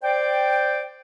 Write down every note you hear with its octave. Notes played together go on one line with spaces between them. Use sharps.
C5 D5 G5